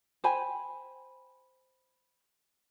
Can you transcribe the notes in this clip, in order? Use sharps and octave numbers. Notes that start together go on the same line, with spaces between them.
C5 G5 G#5 B5